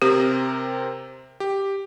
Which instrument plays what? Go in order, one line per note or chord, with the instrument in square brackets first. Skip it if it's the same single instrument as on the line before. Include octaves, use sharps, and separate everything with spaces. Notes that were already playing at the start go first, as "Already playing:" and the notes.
[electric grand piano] C3 C4 A#4 [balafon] G4
[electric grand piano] G4